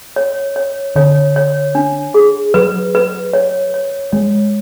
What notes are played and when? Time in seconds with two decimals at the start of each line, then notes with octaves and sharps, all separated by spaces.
0.16 C#5
0.56 C#5
0.96 D3 C#5
1.36 C#5
1.75 D4
2.14 G#4
2.54 F#3 B4
2.95 B4
3.33 C#5
3.74 C#5
4.12 G#3 C#5